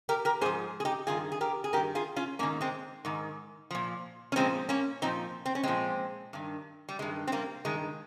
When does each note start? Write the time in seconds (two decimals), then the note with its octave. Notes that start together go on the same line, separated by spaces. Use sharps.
0.09 G4 A#4
0.25 G4 A#4
0.41 G#2 G#4 C5
0.46 F3
0.80 G#4
0.85 D#4 G4
1.07 G2 D#3 F4 G#4
1.32 G#4
1.41 G4 A#4
1.64 G#4
1.73 G2 G4 A#4
1.76 D#3
1.95 F4 G#4
2.16 C#4 F4
2.39 G#2 A#3 C#4
2.43 D#3
2.61 G#3 C4
3.05 G#2 D#3
3.71 A#2 F3
4.32 C#4
4.36 A#2 F3 G#3 C4
4.69 A#3 C#4
5.02 A#2 F3 C4 D#4
5.46 C4
5.55 C#4
5.63 A#2 F3 G#3 C4
6.33 G2 D#3
6.89 G3
6.99 G2 D#3 G#3
7.27 C4
7.32 G3 A#3
7.65 G2 D#3 G#3